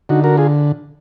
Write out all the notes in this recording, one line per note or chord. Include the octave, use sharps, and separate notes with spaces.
D3 D#4 F#4
F#4 A#4
F4 G#4